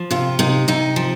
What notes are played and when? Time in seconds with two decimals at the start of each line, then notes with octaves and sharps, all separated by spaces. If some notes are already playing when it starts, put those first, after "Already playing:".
Already playing: F3
0.11 C3 F4
0.39 C3 D#4
0.68 C3 D#4
0.96 F3